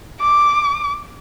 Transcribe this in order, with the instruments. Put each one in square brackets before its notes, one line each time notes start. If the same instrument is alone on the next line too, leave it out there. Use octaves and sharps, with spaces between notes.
[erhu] D6